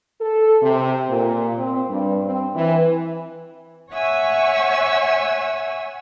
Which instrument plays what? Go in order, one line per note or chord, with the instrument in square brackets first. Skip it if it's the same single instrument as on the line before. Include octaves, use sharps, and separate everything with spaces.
[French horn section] A4
C3
A#2
C4
G2
C4
E3
[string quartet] C#5 E5 F#5 G#5 C#6 E6